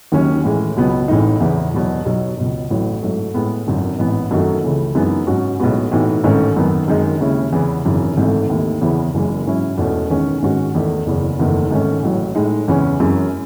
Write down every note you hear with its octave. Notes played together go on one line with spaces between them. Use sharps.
D#2 D#3 F#3 C#4
A2 E3 G#3
C#2 B2 F#3 B3
A1 A2 E3 G#3 D#4
E2 C#3 E3 B3 E4
E1 E2 B2 F#3
B1 B2 F#3
C#2 B2 F#3
A1 A2 F#3
G#2 F#3 A3
A2 G#3 B3
G#1 F#2 D#3
A1 G#2 E3 B3
F#2 D#3 A3 D#4 F#4
C#2 C#3 E3 A3
F#2 E3 G#3 B3 D#4
G#2 F#3 C#4 F#4
B1 A2 G#3 B3 F#4
A2 E3 B3 D#4 F#4
A1 G#2 D#3 A3 C#4
F#2 D#3 F#3 B3
F#2 D#3 G#3 D#4
D#2 C#3 G#3 C#4 E4
E2 C#3 E3 B3
G#1 F#2 C#3 E3
G#1 G#2 E3 A3
D#2 D#3 A3 E4
E2 C#3 E3 B3 E4
F#1 F#2 E3 G#3
G#2 F#3 C#4 E4
E1 E2 B2 A3 C#4
E2 D#3 G#3 C#4
G#2 D#3 G#3 C#4 F#4
E2 D#3 A3 D#4
F#1 E2 C#3
F#1 E2 D#3 A3
G#2 D#3 A3 C#4
A1 A2 F#3
A2 G#3 D#4
E2 C#3 E3 G#3 C#4
F#2 E3 G#3 C#4